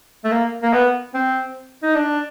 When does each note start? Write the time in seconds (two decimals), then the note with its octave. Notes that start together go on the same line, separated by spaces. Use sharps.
0.24 A3
0.32 A#3
0.63 A#3
0.74 B3
1.14 C4
1.83 D#4
1.95 D4